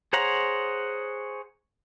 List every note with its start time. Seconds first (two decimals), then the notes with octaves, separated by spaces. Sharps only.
0.13 G#4 C5 C#5 F#5 A#5